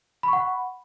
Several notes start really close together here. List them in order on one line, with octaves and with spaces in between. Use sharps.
B5 C#6 F#5